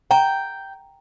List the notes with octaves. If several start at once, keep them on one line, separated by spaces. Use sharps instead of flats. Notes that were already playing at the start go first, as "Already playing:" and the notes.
G5 A#5